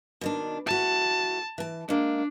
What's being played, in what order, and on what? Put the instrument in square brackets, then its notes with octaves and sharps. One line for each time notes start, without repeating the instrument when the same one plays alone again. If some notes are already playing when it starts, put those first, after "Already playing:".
[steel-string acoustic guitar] B2 D#3 D4
[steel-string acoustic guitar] E4 F#4 [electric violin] A5
[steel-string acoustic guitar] E3 A5
[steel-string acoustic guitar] G#3 A#3 [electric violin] D4